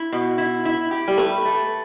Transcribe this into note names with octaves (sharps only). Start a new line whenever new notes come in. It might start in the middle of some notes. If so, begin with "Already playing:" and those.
Already playing: E4
B2
E4
E4
G4
G3
A3 B4
A3